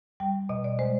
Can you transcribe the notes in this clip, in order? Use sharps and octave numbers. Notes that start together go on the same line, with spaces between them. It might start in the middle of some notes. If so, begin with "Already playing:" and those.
G3 G5
B2 D#5
D5
G#3 C5